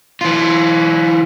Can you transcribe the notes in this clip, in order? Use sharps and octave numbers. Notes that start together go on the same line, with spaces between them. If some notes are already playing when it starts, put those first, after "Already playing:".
E3 F4